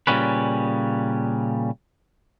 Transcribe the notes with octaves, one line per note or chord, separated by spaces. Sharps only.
A#2 C#3 G3 C#4 B4